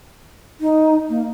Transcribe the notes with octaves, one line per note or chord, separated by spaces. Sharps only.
D#4
A#3